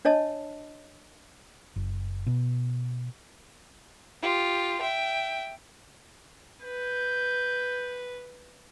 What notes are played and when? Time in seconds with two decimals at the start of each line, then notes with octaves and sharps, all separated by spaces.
0.05 D4 C#5 D#5 A5
1.76 F#1
2.27 B2
4.22 F4 G4
4.81 E5 G5
6.63 B4 G6